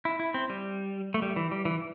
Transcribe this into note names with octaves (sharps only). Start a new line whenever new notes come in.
E4
E4
C4
G3
A3
G3
E3
G3
E3